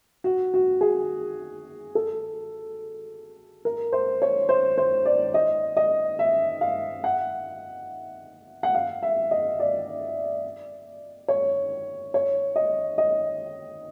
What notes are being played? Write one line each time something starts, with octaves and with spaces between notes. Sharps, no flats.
F#4
F#4
G#4
A4
A#4
C5
C#5
C5
C5
D5
D#5
D#5
E5
F5
F#5
F#5
F5
E5
D#5
D5
C#5
C#5
D#5
D#5